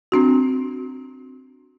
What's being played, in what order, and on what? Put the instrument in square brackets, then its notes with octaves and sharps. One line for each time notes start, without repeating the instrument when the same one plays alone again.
[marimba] C4 D4 F#4